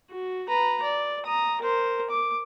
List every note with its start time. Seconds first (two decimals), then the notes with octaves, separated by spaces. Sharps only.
0.11 F#4
0.48 B4 A#5
0.83 D5
1.26 A#5 D#6
1.61 A#4 C5
2.10 D6